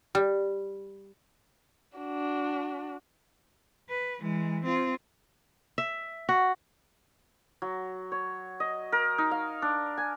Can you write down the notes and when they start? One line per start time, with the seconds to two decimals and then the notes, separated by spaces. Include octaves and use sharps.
0.15 G3
1.98 D4 F#4
3.89 B4
4.20 E3 G#3
4.64 C4 F4
5.78 E5
6.29 F#4
7.62 F#3
8.12 C#5
8.60 D#5
8.92 A#4
9.18 D#4
9.31 F5
9.62 D4
9.98 G#5